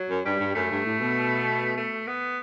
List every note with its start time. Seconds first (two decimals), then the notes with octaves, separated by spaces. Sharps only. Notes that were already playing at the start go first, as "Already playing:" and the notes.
Already playing: F#3
0.09 F#2
0.25 G2 G3
0.39 G2
0.55 F#2 A3
0.71 G2
0.85 A2
1.00 B2
1.77 A3
2.07 B3